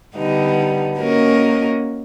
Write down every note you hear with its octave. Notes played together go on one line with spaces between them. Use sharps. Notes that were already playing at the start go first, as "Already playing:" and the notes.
D3 G3 B3 D#4
A#3 C#4 F#4 A#4 D#5